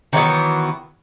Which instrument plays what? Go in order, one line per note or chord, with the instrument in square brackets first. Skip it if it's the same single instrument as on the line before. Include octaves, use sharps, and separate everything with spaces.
[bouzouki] D#3 E3 F#3 B3